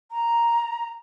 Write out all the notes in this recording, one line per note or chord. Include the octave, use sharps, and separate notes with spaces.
A#5